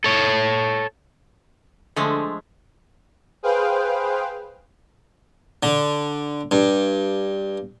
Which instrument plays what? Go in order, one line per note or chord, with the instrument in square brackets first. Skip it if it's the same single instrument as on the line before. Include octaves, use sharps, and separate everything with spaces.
[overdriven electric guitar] A4 C#5
[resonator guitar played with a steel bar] D3 [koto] F3 G#3 A3
[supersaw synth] G#4 B4 C5 F5 G5
[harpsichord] D3
G2